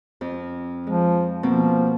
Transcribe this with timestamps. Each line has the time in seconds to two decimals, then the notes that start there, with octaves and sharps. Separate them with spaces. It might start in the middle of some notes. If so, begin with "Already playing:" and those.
0.21 F2
0.87 F3 G#3
1.43 B2 F3 A#3 C4